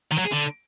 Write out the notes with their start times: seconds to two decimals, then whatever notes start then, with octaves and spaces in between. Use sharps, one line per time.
0.12 D#3
0.18 F#3
0.25 G#4
0.32 D3